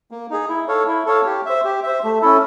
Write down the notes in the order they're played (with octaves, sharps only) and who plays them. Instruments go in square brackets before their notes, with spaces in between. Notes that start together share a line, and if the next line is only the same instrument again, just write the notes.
[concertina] A#3
D#4 G#4
E4
A4 C#5 F5
E4
A4 C#5 F5
G4
C5 E5
G4
C5 E5
A3
C#4 E4 A4